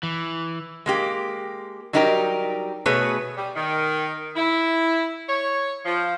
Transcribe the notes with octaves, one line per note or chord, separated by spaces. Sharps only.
E3
G#3 A#3 G4
F#3 G3 D#4 G4 A#4
B2 A3 G#4 B4 C#5
G3
D#3
E4
C#5
F3